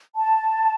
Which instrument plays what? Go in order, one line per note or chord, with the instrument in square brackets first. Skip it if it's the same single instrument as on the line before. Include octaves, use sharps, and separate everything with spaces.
[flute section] A5